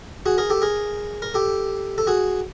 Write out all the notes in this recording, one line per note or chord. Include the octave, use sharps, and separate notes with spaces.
F#4 G#4
G#4 A#4
G4 A4
G#4 A#4
A#4
G4 A4
A4
F#4 G#4